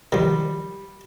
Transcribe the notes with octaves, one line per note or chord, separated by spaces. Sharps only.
D#3 F3 G3